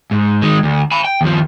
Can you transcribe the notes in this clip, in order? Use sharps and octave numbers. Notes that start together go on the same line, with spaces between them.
G#2
D#3 G#3
D2
G#5 B5
G5
D#2 F3